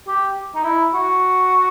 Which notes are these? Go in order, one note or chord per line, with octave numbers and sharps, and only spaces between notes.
G4
D#4
E4
F#4